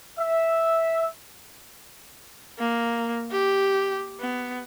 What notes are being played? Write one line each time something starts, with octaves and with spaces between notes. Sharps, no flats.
E5
A#3
G4
B3